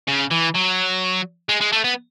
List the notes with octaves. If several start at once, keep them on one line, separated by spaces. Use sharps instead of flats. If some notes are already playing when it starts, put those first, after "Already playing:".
C#3
E3
F#3
G#3
G#3
A3
B3